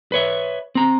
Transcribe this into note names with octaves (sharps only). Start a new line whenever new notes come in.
B4 C#5 E5
C4 A#5